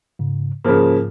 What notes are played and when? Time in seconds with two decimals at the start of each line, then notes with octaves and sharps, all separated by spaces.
0.19 G#2 C#3
0.64 G#2 C#3 F3 A#3